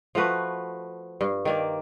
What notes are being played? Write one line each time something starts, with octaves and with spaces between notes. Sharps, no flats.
F3 A3 F#4 B4
G2
D#3 A#3 D5